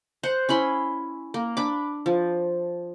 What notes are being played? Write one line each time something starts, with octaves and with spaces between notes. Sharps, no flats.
C5 F#5
C#4 E4 B5 C6
A#3
D4 B5 D6
F3